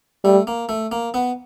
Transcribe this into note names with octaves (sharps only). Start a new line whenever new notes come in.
G3 A3
A#3
A3
A#3
B3